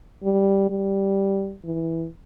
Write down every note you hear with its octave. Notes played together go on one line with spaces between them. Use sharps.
G3
G3
E3